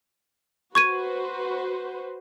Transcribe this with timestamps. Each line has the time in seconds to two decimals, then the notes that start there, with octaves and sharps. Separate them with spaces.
0.75 F#4 B4 C5 C#6 G#6 D#7